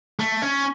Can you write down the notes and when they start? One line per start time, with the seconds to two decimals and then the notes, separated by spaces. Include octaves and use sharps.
0.20 A3
0.42 C#4